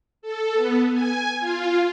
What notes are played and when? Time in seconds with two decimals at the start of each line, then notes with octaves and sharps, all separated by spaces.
0.22 A4
0.54 B3
0.92 G#5
1.40 F4